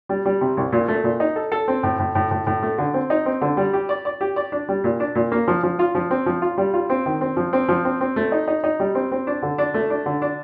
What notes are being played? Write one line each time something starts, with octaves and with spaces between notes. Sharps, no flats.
G3
G3
C3
C2
A#2
A3
A#2
D#4
A4
A4
C4
A2
A2
A2
A2
A2
A3
D3
C4
D#4
C4
D3
G3
G4
D5
D5
G4
D5
D4
G3
A#2
D4
A#2
A#3
F3
F3
F4
F3
C4
F3
F4
G3
F4
C4
D#3
C4
F3
C4
F3
C4
C4
A3
D#4
D#4
D#4
G3
C4
C4
D4
D3
D4
A3
D4
D3
D4